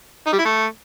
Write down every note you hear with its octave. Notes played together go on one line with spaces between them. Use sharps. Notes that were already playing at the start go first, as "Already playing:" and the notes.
D#4
G3
E4
A3